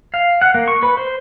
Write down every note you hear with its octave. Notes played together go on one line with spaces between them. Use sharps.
F5
F#5
A#3
C#6
B4
C5